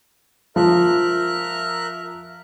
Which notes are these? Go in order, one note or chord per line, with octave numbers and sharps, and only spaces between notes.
F3 A#4 E5 F#6